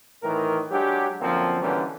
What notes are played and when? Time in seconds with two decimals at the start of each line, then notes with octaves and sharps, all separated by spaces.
0.23 A2 D#3 E3 A#4
0.71 F#3 G#3 D4 G4
1.21 F#2 D3 F3 A#3 C4
1.62 B2 D3 E3 G3 A#3 C#4